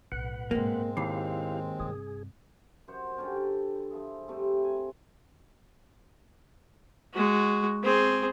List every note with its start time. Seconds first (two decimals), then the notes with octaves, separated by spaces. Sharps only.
0.12 B1 A2 B4 F#5
0.51 G#2 B2 G#3 A#3 C4
0.97 D#2 E4 G4 F5
1.80 G2 C3 G#4
2.88 F#2 C5 F#5
3.17 D3 G3 C#4 G5
3.36 D3
3.90 F3 E4 G#4
4.28 C3 G3 A3 C4
4.64 G#5
7.14 G#3 F#4
7.84 C4 G#4